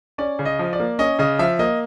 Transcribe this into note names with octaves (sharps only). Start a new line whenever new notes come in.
C#4 D5
C#3
D#5
F3
D5
A#3
C#4 D#5
C#3 D#5
F3 E5
A#3 D#5